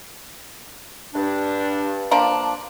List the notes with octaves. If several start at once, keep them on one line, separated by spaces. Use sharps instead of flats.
G2 D4
F3 A#3 D4